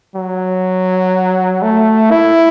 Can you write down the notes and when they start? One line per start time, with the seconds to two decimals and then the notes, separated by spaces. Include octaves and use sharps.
0.16 F#3
1.62 A3
2.11 E4